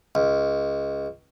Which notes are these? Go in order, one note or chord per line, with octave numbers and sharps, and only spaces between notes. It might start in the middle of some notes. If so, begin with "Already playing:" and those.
C#2